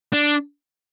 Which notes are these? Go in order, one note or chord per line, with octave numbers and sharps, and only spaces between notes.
D4